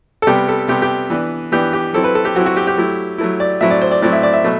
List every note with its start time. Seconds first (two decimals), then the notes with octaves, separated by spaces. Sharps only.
0.22 A4
0.27 C3 G3 B3 G4
0.48 A4
0.68 C3 G3 B3 G4
0.82 G4
1.10 E3 B3 D4
1.52 E3 B3 D4 G4
1.73 G4
1.93 F#3 C4 E4 A4
2.04 B4
2.15 A4
2.25 G4
2.35 F#3 C4 E4 F#4
2.46 F#4
2.57 G4
2.67 G4
2.77 F#3 A3 E4
3.18 F#3 A3 E4
3.40 D5
3.61 A2 F#3 C4 E4 E5
3.71 D5
3.81 C5
3.91 D5
4.02 A2 F#3 C4 E4 D5
4.13 E5
4.23 D5
4.34 E5
4.44 B2 F#3 A3